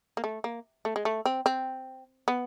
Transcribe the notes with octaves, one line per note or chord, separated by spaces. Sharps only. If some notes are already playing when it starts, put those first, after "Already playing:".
A#3
A3
A#3
A3
G#3
A3
C4
C4
B3